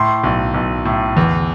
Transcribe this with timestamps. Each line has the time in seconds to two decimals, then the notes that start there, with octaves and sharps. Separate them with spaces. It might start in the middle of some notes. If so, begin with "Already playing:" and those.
Already playing: A2 C6
0.24 B1
0.54 B1
0.85 A2
1.17 E2